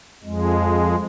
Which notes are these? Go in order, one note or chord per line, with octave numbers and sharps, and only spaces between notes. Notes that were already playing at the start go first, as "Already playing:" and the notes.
F2 G#3